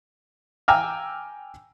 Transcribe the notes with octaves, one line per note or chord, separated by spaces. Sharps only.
G5 G#5 A#5 D6 E6 F6